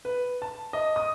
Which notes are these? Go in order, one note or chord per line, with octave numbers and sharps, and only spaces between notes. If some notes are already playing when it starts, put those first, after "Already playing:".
B4
A5
D#5
D#6